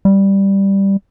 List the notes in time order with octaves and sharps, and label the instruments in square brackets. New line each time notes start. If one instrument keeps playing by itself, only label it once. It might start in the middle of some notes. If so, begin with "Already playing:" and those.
[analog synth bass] G3